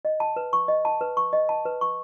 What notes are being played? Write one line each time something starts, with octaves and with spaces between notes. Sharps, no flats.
D#5
A5
B4
C#6
D#5
A5
B4
C#6
D#5
A5
B4
C#6